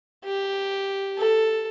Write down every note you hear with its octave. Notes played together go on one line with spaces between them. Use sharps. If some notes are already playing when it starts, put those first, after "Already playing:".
G4
A4